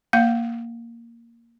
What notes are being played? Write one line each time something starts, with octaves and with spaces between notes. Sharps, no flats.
A#3 F5